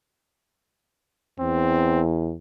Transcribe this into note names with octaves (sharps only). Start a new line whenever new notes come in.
E2 C4